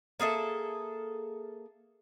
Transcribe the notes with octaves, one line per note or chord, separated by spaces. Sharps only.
A#3 G#4 A4 E5